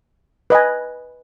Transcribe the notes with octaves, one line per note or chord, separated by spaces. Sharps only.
B4 D#5 G#5